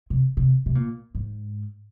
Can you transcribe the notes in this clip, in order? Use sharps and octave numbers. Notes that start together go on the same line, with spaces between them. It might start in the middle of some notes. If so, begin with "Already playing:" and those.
C3
C3
C3
A#2
G#2